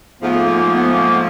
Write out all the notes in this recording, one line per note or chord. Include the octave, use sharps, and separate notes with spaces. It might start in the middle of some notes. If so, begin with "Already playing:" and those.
G#2 F3 A3 B3
A#3
A#3
B3
A#3